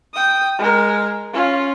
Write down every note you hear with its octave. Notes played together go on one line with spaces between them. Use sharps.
G5 D#6
G#3 A#4
C#4 F4